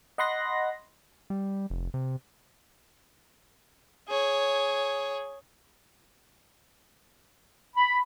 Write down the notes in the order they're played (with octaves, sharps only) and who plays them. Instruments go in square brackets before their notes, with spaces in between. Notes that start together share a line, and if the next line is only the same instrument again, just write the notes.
[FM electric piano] D#5 F#5 B5 C6 F#6 A#6
[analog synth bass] G3
F1
C3
[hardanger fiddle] G#4 C#5
[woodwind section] B5